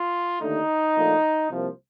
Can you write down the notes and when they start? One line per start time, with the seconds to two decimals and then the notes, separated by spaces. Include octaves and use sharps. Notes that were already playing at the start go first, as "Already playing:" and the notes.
Already playing: F4
0.40 D#2 D3 A3 D#4
0.95 A#1 A#2 A3
1.49 C2 C3 F3 A#3